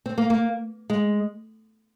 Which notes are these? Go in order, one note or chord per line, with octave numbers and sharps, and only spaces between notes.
C4
A#3
A#3
G#3